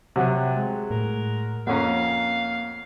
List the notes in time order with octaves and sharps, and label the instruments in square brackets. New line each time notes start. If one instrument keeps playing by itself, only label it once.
[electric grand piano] C3 [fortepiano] F#3
[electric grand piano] G#3
[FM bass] A2 [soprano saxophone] A#4
[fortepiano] F2 C#4 A#5 [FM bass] A#3 [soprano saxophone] F5 [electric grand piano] F#5